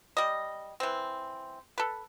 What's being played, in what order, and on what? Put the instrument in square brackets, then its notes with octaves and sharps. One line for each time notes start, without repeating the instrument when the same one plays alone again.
[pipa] G3 D#5
E3 C4
A4 B4